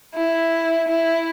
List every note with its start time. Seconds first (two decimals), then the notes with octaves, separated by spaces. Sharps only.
0.15 E4
0.88 E4